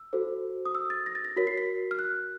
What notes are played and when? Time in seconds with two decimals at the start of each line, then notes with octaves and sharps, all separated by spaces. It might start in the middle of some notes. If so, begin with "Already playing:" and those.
Already playing: E6
0.13 F#4 A4 C5
0.65 D#6
0.75 E6
0.90 A6
1.06 A#6
1.15 A6
1.25 A#6
1.36 F#4 A#4 C#5 B6
1.47 C7
1.58 B6
1.91 F6
1.99 F#6